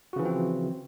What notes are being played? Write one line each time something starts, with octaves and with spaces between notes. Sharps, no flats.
C#3 E3 F3 C4 F#4